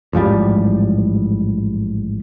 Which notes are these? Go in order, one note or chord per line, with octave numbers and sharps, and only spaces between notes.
A1 G#2 F3 G3